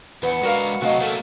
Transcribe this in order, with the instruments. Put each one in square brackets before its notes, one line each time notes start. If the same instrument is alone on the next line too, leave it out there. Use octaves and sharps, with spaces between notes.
[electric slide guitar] E2 [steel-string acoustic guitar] B4 [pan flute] F#5
[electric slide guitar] G#3 D4 A#5 [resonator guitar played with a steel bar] F#4 A#4 F5
[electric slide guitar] C3 F#3 [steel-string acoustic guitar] A3 D#5 [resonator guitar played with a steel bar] F#4 F5
[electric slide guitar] F#3 A3 A#3 [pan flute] A4 [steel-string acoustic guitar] A#4